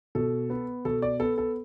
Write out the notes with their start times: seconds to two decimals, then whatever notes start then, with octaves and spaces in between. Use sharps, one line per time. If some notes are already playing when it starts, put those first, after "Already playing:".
0.15 B2 A4
0.50 B3
0.85 B2 A4
1.02 D5
1.20 B3 A4
1.38 A4